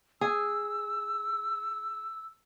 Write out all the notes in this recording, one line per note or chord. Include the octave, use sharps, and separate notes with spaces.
G#4 E6